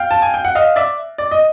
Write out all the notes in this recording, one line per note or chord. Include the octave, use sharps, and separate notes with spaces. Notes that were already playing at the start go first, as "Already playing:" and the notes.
Already playing: F5 G5
A5
G#5
G5
F#5
D#5 F5
D5 E5
D5
D#5